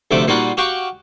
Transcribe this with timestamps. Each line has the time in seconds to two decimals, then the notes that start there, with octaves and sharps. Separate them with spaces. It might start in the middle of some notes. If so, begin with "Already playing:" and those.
0.11 D2 C3 F3 A3 D6
0.27 A#2 G3 A#3 D#4 F4 F#4
0.57 F#4 G4 F5 G5 C#6